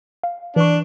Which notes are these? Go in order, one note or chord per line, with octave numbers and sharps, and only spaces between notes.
F5
E3 D4 C#6